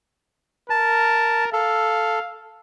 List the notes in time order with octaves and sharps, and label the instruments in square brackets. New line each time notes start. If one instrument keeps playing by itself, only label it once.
[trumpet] A#4 [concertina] A5
[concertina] A4 [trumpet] F5